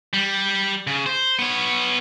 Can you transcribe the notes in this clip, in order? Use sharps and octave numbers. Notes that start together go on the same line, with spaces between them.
G3
C#3
C5
B3 C#5